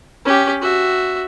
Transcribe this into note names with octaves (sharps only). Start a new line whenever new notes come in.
C#4 G4
F#4 E5